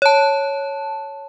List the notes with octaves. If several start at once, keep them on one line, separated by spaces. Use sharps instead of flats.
C#5 A5